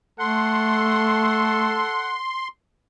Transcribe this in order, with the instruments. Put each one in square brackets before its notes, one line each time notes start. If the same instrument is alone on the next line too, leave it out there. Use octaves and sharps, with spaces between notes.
[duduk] A3 [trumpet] A4 [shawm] F#5 [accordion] C6